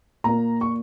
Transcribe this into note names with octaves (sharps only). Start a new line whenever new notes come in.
A#2 A#3 A#5
C#6